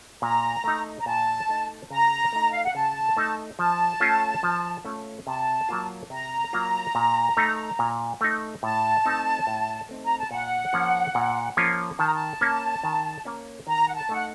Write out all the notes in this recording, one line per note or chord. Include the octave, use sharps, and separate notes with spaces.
A#2 A#5
A3 D#4
A#5
A#2 A5
A3 D#4
C#3 A#5
A3 D#4
F5
F#5
C#3 A5
A3 D#4
F3 A5
A3 C#4 F4
F3
A3 C#4 F4
C3 A5
F#3 A#3 F4
C3 A#5
F#3 A#3 F4
A#2
A3 D#4
A#2
A3 D#4
A2 A5
A3 C4 D#4
A2
A3 C4 D#4
A#5
A5
A#2 F#5
F3 A#3 C#4 F4
A#2
F3 A#3 C#4 F4
D#3 A5
A#5
A5
A#3 C#4
D#3
A#3 C#4
D#3 A#5
F#5
A5
A3 D#4 F#5